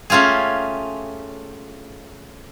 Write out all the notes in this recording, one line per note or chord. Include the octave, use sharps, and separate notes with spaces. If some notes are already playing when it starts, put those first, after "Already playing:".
A3 C#4 F4 G4 G#4